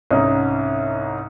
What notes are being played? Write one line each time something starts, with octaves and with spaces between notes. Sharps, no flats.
C2 G#2 C#4 D#4